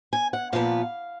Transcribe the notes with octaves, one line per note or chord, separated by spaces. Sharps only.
G#5
F#5
A#2 F3 B3 F5